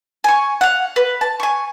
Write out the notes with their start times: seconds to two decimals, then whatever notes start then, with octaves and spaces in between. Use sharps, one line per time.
0.24 G#5 C#6
0.61 F5 F#5
0.96 B4
1.21 A5
1.40 G#5 C#6